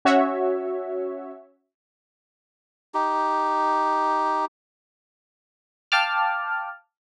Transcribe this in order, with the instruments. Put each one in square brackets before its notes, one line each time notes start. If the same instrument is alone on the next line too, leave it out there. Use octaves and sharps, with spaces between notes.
[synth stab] C#4 F#4 C#5 E5
[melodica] D#4 G4
[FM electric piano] F5 G5 A5 D6 F6